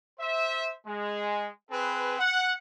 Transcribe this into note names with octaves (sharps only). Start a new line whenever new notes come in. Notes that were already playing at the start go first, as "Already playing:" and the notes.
C5 E5
G#3
C4 G#4 B4
F#5